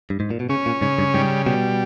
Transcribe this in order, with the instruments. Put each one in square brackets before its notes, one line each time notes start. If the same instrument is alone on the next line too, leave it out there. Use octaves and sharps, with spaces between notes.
[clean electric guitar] G2
G#2
A#2
B2
[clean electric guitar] C#3 [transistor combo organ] C#4
[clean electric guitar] A#2
[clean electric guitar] G#2 [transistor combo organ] C#3
[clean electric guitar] G2
[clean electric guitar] G#2 [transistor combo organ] G3
[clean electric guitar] B2 [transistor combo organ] G3